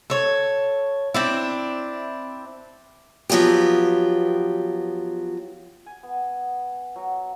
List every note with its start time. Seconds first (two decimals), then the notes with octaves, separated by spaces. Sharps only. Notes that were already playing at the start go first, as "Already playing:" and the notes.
0.10 A4 C#5
1.14 C4 D4 E4
3.30 F3 F#3 B3 F4 G4
5.86 G#5
6.03 B3
6.96 F#3